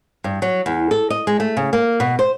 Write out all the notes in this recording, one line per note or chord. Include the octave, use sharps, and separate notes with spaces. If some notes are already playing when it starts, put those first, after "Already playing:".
G2
F#3
E2
A4
D#5
G#3
A3
C#3
A#3
B2
C5